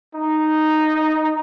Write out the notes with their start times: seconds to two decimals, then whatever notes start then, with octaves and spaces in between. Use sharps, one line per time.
0.15 D#4